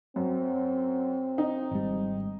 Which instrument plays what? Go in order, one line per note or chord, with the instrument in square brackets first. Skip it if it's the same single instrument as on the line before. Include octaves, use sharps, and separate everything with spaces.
[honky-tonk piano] F#2 [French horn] C4
[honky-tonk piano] D#4
[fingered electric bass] G#1 G3